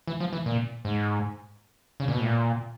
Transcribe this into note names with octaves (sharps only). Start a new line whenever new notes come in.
E3
F3
E3
A#2
G#2
C#3
A#2
B2
A2
A#2